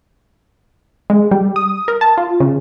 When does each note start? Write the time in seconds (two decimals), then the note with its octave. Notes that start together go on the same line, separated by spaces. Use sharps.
1.10 G#3
1.31 G3
1.56 D#6
1.88 A#4
2.01 A5
2.18 F4
2.40 C#3